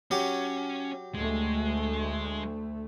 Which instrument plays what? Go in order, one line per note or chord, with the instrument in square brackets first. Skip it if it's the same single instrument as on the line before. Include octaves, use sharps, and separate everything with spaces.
[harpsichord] F#3 G4 [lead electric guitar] C#4
[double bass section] D2 A3 [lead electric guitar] G#3